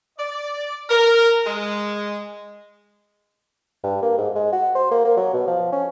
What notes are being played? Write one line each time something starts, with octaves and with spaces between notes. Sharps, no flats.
D5
A#4
G#3
G2
A#3
G#2
G#3
F#4
C5
A#3
A#3
F#3
B2
F3
C#4